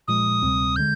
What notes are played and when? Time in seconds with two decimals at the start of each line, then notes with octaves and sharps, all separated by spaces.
0.08 A#2 F3 G#3 D#6
0.43 D2 C3 G3 C4
0.76 D3 G#3 G6